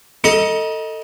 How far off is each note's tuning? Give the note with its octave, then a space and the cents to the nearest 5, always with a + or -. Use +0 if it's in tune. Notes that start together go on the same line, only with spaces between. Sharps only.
A4 +20 D#5 +10 A#5 +45